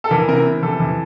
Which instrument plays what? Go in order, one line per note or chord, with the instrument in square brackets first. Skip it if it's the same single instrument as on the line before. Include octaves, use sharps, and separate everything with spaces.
[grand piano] A4
E3 A#4
C3 A#4
C3
E3 A4
E3